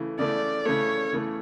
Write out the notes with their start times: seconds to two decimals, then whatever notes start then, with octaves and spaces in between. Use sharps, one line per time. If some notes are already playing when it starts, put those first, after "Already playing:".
Already playing: C#3 E3 A3
0.18 C#3 E3 A3 D5
0.65 C#3 E3 A3 C#5
1.13 C#3 E3 A3